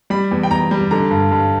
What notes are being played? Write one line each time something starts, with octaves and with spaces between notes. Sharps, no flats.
G3 B5
E2
G5
E2 A#5
G3
D3 A#5
G2
G2